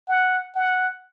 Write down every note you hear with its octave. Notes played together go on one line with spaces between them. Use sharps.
F#5
F#5